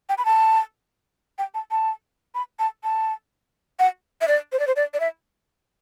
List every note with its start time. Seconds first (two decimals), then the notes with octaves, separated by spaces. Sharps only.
0.09 G5
0.18 B5
0.25 A5
1.38 G5
1.54 A5
1.71 A5
2.35 B5
2.59 A5
2.84 A5
3.79 F#5
4.21 E5
4.28 D5
4.52 C5
4.59 D5
4.67 C5
4.76 D5
4.94 D5
5.00 E5